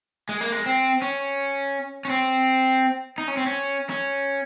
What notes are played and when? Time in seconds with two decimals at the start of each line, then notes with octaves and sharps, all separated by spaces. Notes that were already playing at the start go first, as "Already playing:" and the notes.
0.29 G#3
0.41 A#3
0.52 G#3
0.66 C4
1.02 C#4
2.05 C#4
2.09 C4
3.18 D#4
3.28 C#4
3.37 C4
3.46 C#4
3.90 C#4